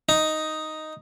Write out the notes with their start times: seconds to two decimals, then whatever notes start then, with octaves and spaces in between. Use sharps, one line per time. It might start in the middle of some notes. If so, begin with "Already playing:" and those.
0.09 D#4